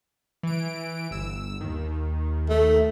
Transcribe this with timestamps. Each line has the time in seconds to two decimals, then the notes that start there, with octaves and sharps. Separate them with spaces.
0.43 E3 D7
1.11 G1 E6
1.61 D#2 D#3
2.50 A3